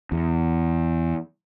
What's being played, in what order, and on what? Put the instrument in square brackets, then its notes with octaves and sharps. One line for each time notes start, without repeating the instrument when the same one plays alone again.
[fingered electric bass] E2